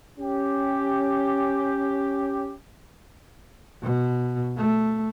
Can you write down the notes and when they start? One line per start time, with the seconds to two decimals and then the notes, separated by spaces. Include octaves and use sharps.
0.19 C#4 G4
3.83 B2
4.58 A3